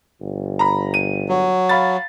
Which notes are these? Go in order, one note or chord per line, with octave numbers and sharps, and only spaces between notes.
G1
A#5 B5
D#7
F#3
F5 B5 A6